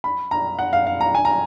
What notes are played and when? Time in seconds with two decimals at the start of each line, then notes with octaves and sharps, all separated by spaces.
0.04 B5
0.31 A#5
0.59 F#5
0.73 F5
0.87 F5
1.01 A#5
1.15 G#5
1.25 A#5